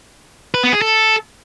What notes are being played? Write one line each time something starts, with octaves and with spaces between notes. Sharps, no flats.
B4
B3
G#4
A4